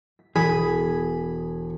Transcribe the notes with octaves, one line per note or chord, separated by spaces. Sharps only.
B6
E1 G#4 B5